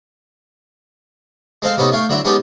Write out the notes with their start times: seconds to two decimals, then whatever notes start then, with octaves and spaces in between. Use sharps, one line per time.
1.62 G#3 C4 A4 C5 F5
1.77 C3 B3 C#4 D#4 A4
1.92 A3 C#5 F5 G5
2.09 D3 F#3 C4 E4
2.25 G#3 B3 C#4 D#4 G4 A4